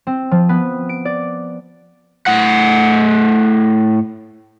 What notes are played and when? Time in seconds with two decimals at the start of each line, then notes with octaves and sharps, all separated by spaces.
0.07 C4
0.31 F3
0.49 B3
0.89 D7
1.05 D5
2.26 A2 F#5